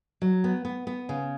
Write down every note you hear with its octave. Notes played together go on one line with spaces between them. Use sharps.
F#3
B3
B3
B3
C#3